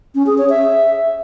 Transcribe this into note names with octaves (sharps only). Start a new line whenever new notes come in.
C#4
G#4
C#5
E5